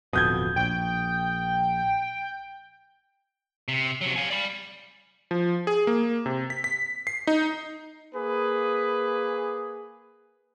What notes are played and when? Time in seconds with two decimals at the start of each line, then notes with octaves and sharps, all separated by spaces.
0.13 D1 F2 B2 D#6 G6 G#6
0.56 A#1 G5
3.68 C3
4.01 C3 F#3
4.16 F5 G#5
4.30 D5 B5
5.31 F3
5.67 G#4
5.87 A#3
6.26 C3
6.50 B6
6.64 B6
7.07 C7
7.27 D#4
8.14 A#3 G#4 B4